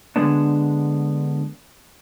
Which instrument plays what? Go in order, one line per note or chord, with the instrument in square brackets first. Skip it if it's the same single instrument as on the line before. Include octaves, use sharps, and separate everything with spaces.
[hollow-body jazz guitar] D3 G#3 B3 D4